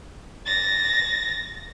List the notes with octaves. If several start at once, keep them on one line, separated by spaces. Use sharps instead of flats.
A6 A#6